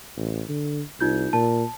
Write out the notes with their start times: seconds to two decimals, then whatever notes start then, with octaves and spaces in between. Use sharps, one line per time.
0.17 A1
0.49 D3
1.00 C2 D#4 F4 G6
1.33 A#2 A5